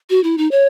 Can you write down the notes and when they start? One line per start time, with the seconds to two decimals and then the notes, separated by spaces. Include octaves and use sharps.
0.10 F#4
0.23 E4
0.38 D#4
0.51 C#5